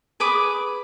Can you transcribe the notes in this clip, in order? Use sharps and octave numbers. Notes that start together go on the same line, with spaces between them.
G#4 B4 D6 D#6